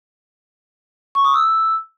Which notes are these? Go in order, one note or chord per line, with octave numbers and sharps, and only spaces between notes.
C#6
D#6
E6